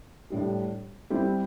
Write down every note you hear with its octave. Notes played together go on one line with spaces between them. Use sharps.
A2 G3 D4 G4
G3 C4 E4 G4